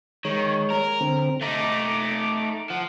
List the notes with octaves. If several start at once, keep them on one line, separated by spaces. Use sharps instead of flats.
D#3 G#3 C#5
A#4
D3 C4
A3 D#4 A#5 D6
F3 F#5